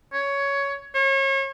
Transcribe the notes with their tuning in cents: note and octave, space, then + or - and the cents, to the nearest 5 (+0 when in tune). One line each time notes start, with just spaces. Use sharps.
C#5 +10
C#5 -35